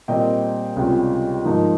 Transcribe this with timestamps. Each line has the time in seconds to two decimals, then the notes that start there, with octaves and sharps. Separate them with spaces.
0.08 A#2 G3 C4 D#5 G5
0.76 C#2 C3 G3 C#4 F4
1.45 G#2 F3 A#3 D#4